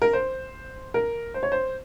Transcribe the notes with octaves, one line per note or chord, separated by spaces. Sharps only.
A#4
C5
A#4
C5
C#5
C5